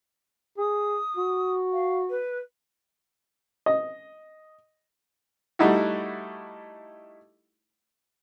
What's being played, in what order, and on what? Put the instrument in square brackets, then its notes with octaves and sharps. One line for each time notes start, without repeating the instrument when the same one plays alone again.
[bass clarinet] G#4 [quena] D#6
[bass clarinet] F#4
[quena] F5
B4
[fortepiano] D#5
G3 A3 D#4 E4 F#4